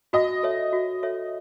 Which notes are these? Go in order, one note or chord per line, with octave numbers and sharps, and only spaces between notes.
F#4 D#5
A4 C#5 E5
F#4
A4 C#5 E5